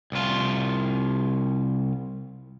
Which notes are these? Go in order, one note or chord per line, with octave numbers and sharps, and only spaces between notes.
C2 F4